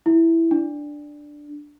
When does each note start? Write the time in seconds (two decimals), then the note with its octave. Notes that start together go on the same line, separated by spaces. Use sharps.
0.06 E4
0.51 D4